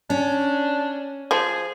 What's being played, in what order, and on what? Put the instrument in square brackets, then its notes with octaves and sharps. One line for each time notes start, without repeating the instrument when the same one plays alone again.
[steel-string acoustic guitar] C#4 [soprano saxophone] D4
[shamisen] F3 C5 [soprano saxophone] G#4